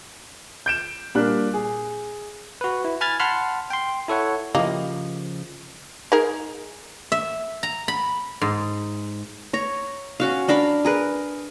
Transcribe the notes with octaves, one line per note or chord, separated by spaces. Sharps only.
G6 D7 E7
A#2 G3 D4 A#4 F#6
G#4
F#4 B4
E4
G#5 B5 F6 G#6 A6
F#5 A5 B5 C6 F6
G5 C6
E4 A4 C#5 F#5
C#3 F3 A#3 E4 G4 D#5
D#4 G#4 A#4
E5
A#5
B5
G#2
C#5 A#5
C#4 F#4 F5
D4 A#4 F5 B5
G#4 A#4 B4